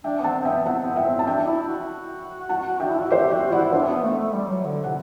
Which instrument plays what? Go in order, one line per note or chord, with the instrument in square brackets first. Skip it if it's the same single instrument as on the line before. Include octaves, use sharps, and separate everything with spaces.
[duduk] D4 [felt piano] E5 G5
[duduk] B3
[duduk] C4 [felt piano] F#5 A5
[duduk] B3 [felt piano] E5 G5
[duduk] C4 [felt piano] F#5 A5
[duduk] B3
[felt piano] E5 G5
[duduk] C4
[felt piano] A5
[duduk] D4 [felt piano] E5 G5
[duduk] D4
E4
F#4
[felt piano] F#5 A5
[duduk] D4 [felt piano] E5 G5
[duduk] E4
F#4
[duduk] G4 [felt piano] C5 E5
[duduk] F#4 [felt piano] E5 G5
[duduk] E4 [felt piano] D5 F#5
[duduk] E4
[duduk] D4 [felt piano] C5 E5
[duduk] B3
A3
A3
G3
F#3
D3
[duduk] C3 [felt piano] F#5